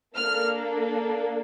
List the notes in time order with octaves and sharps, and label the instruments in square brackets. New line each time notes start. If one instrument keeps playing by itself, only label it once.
[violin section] A#3 D4 A4 F6